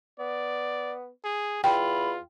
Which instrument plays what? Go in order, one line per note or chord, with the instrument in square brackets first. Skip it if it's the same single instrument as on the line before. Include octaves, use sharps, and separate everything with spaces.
[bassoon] B3 [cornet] D5
[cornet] G#4
[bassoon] E2 [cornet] F4 [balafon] G5 [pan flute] B5